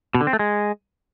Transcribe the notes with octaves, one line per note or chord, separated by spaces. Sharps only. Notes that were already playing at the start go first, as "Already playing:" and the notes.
B2
D3
C4
A3
G#3